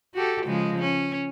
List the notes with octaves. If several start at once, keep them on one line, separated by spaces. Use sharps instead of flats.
F#4 G4 A4
C#3 F3 G#3
C#4